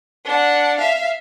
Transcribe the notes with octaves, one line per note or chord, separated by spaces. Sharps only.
D4 F#5
E5 F5